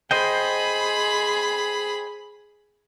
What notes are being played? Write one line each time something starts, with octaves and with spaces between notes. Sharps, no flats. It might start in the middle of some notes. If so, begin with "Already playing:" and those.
G#4 C5 D#5 G5 B5